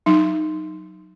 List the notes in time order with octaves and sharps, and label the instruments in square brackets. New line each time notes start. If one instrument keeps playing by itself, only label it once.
[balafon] F#3 D#4